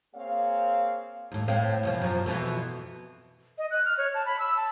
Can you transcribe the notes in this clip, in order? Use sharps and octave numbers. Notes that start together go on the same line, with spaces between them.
A#3 C4 G#4 C#5 F5
D#2 A2
A2 C4 F5
E2 B2 F3
F#2 F3
F2 B2 E3
D#5
F#6
F6
C#5
A5
B5
E6
A5